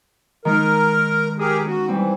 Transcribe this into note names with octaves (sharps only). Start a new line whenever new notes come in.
D#3 G#3 D#4 A#4
G4 G#4 A#4 D#6
C#4 F#4
E3 G3 C4